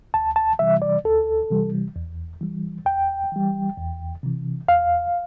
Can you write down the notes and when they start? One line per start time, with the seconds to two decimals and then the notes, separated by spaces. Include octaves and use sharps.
0.14 D2 A5
0.36 A5
0.59 C3 E3 G3 E5
0.82 D5
1.05 D2 A4
1.50 C3 E3 G3
1.96 E2
2.41 E3 G3
2.86 E2 G5
3.32 E3 G3
3.78 E2
4.23 C3 E3
4.68 E2 F5